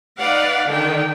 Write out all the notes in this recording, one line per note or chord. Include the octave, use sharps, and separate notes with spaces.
D#4 B4 D5 F5 F#5
D3 D#3 G5